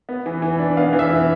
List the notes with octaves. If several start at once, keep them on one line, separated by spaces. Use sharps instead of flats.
B3
E3
E3
D4
B3 F5
E3
E5
E3